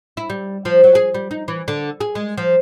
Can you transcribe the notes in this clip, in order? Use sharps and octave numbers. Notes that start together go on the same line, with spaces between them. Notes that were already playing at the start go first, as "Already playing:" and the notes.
E4
G3
F3
F#3
G#4
G3
D#4
E3
D3
G#4
G#3
F3